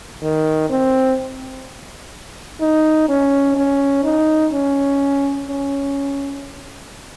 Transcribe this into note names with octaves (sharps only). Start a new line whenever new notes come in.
D#3
C4
D#4
C#4
C#4
D#4
C#4
C#4